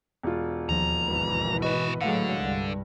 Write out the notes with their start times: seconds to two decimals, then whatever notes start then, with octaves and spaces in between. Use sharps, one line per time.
0.23 E1 F4
0.69 D#2 D#3 F3 A#5
1.04 G#1 B2 E3
1.62 F#4 G#4 B4 D#5
2.01 A2 D3 F#3 G#3 F5 F#5
2.38 C2 G2